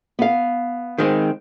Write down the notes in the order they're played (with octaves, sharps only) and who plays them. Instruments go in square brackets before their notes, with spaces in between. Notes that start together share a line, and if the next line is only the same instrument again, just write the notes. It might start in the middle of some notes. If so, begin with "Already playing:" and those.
[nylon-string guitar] B3 F5
[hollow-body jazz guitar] D#3 G#3 C4